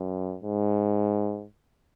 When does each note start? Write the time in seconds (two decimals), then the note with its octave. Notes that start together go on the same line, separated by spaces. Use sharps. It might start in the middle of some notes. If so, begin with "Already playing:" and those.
Already playing: F#2
0.43 G#2